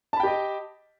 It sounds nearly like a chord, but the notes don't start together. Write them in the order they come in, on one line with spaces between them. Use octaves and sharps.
A5 B5 G5 G4 D#5